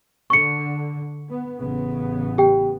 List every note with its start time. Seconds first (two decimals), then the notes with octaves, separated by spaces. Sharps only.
0.30 D3 C#6 C#7
1.29 B3
1.58 A1 C#3 B3
2.38 G4 G5